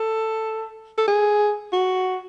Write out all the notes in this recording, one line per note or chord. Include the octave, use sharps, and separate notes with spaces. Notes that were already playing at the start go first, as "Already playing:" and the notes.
Already playing: A4
A4
G#4
F#4